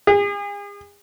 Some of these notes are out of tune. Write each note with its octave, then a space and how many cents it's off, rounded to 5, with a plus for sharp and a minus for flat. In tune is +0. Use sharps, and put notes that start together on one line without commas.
G#4 -40